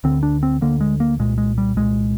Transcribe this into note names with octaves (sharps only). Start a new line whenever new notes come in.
D2 D3 C4
D4
C4
D2 D3 A#3
G#3
A#3
C2 A#2 G#3
G#3
G3
C2 A#2 G#3